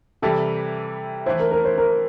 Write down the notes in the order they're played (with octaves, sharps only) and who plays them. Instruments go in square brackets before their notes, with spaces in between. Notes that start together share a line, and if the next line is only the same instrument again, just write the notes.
[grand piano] C3 E3 G3 [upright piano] A4
[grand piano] E3 A3 E4 [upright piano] C5
[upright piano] A#4
A#4
C5
A#4